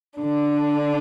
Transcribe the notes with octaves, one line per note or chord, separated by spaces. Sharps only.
D3 D4